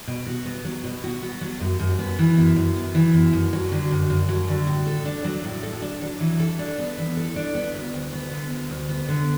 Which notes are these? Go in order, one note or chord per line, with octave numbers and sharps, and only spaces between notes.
B2
F#4
B3
F#3
B2
F#4
B3
F#3
F#2
F#2
B3
E3
F#2
F#2
B3
E3
F#2
F#2
F#3
D3
F#2
F#2
F#3
D3
A2
A4
D4
F#3
A2
A4
D4
F#3
E3
A4
D4
B3
E3
A4
D4
B3
D2
D2
B3
D3
D2
D2
B3
D3